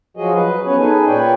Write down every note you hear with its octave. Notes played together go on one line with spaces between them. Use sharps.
F3 F#3 F#4 G#4 D#5
B4
B3 C#4 B4 C#5
D#4 G#4 A4 B4 G#5
A#2 B4 C#5 D5 G5